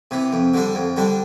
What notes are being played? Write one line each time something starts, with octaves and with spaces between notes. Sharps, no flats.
C3 E3
F2
D3 G3 D4
F2
D3 G3 D4